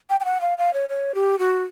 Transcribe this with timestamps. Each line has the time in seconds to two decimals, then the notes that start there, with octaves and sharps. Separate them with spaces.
0.10 G5
0.20 G5
0.25 F#5
0.41 F5
0.58 F5
0.73 C#5
0.89 C#5
1.15 G4
1.39 F#4